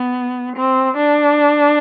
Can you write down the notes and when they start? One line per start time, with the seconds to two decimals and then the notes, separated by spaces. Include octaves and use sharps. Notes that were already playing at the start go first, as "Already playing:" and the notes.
Already playing: B3
0.56 C4
0.97 D4